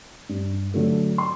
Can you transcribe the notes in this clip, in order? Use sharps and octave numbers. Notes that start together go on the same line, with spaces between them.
G2
D3 F#3 A3
C6